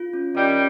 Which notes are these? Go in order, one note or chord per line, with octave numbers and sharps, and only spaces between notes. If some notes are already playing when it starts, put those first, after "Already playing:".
Already playing: F4
C#4
D#3 G3 C#4